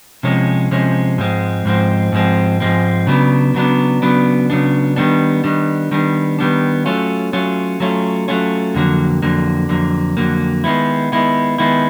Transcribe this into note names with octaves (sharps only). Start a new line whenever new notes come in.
C3 F3 G#3 C#4
C3 F3 G#3 C#4
G#2 F3 G#3 C4
G#2 F3 G#3 C4
G#2 F3 G#3 C4
G#2 F3 G#3 C4
C#3 F#3 B3 D4
C#3 F#3 B3 D4
C#3 F#3 B3 D4
C#3 F#3 B3 D4
D#3 G3 B3 D4
D#3 G3 B3 D4
D#3 G3 B3 D4
D#3 G3 B3 D4
F#3 A3 C#4 F4
F#3 A3 C#4 F4
F#3 A3 C#4 F4
F#3 A3 C#4 F4
F2 D3 F#3 A#3
F2 D3 F#3 A#3
F2 D3 F#3 A#3
F2 D3 F#3 A#3
D#3 G#3 B3 E4
D#3 G#3 B3 E4
D#3 G#3 B3 E4